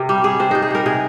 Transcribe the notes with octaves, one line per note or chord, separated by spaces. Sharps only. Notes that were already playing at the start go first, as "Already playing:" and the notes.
Already playing: C3 A#4
G3
G3 G#4
C3 C5
C3 D#4
G#4
G3 A#4
C3 G#4